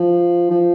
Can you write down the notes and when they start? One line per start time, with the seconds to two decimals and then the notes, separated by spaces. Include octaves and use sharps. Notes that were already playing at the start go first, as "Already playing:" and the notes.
Already playing: F3
0.50 F3